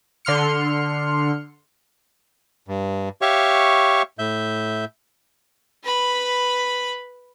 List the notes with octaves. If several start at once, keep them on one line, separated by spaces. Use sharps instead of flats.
D3 C6 F6 C#7
G2
G4 C#5 E5 F5 C#6
A2 E5 G6
B4 B5